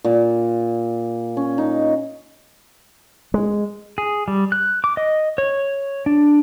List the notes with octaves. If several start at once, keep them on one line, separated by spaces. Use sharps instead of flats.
A#2
C#4
D#4
G#3
G#4
G3
F#6
D6
D#5
C#5
D4